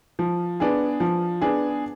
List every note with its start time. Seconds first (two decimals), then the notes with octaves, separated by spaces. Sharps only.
0.19 F3
0.60 B3 D4 G#4
1.00 F3
1.42 B3 D4 G#4